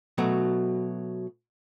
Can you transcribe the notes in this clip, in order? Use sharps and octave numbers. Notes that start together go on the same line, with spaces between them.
B2 F#3 A3